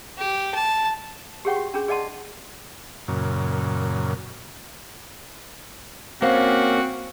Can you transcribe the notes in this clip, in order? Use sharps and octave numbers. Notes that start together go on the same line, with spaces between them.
G4
A5
G4 G#4 C#5 F#5 G5 C#6
F#4
C#4 D4 G#4
G#4 D5 D#5 F#5 A5 C6
F#2 A#2 C#3
A#3 C4 C#4 F#4 C5 F5